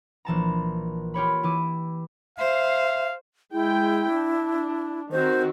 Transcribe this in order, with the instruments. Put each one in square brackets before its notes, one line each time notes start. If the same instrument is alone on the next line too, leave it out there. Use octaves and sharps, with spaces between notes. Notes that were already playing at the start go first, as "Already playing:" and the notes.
[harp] A#1 E3 A5 A#5
F4 G4 C#5 B5
E3 E4 D6 D#7
[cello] C5 [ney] E5 [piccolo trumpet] F5
[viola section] G#3 G5 [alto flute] E4
[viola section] D4
[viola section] D#3 C4 F#4 [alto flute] C5